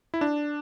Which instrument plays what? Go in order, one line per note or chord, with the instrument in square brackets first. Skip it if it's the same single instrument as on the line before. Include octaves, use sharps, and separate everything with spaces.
[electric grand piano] E4
D4